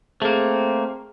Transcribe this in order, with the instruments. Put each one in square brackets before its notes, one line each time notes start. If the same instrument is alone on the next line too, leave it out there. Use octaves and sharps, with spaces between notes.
[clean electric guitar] A3 A#3 [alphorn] C4 [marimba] G#4